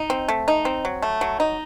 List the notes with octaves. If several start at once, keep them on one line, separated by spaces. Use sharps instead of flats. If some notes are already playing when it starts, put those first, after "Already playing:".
Already playing: D#4
C4
A3
D#4
C4
F#3
A3
F#3
D#4